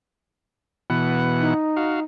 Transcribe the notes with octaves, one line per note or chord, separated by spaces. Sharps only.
B2 E3 F#5
D#4
F#4 F5